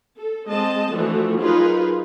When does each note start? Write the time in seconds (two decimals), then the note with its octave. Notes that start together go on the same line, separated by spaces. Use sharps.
0.19 A4
0.51 G#3 C4 D#5 A5
0.95 E3 F3 A3 D4 F#4
1.41 F#3 D#4 F4 G#4 A#4 B4